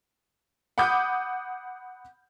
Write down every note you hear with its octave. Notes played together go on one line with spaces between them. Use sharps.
F#5 B5 D6 D#6 G6